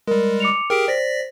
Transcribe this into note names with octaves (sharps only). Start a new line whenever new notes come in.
G3 G#3 A#4
D6 C#7 F7
G4 G#4 A#4 G5 D7
C5 D5 A#6 B6